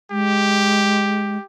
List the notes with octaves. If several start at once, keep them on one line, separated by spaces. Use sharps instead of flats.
G#3 G4